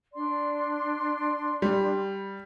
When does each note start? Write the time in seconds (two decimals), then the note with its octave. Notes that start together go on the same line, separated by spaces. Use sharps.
0.13 D4 D5 C6
1.62 G3